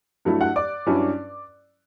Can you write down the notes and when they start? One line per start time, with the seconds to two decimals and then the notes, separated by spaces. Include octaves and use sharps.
0.25 G2 F#3 A3 E4
0.41 F#5 F#6
0.56 D5 D6
0.87 G2 F#3 C#4 E4